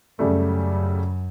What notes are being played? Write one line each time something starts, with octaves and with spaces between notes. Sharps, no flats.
F#2 C#3 G3 A3